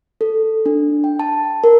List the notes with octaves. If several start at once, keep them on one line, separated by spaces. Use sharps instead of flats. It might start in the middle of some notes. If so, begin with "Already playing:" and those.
A4
D4
G5
A5
A#4